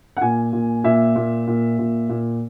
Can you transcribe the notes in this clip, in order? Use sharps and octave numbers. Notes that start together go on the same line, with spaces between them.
F#5
A#2 G#5
A#2
A#2 E5
A#2
A#2
A#2
A#2